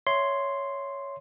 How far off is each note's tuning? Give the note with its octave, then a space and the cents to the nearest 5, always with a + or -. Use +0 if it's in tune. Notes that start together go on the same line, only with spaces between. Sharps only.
C#5 +5 E5 +0 C6 +0